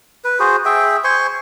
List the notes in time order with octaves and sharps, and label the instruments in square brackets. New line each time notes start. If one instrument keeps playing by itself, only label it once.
[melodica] B4
F#4 G#4 C5
G#4 E5 G5
C5 G#5 C6 C#6